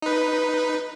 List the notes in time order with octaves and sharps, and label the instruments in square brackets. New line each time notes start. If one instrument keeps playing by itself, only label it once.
[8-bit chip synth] D#4 B4